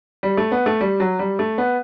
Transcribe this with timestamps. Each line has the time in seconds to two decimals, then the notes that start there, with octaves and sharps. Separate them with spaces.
0.23 G3
0.37 A3
0.52 B3
0.66 A3
0.81 G3
1.00 F#3
1.19 G3
1.39 A3
1.58 B3